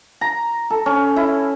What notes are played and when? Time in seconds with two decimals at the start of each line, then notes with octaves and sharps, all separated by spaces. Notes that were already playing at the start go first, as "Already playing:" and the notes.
0.21 A#5
0.70 A4
0.86 C#4
1.16 E4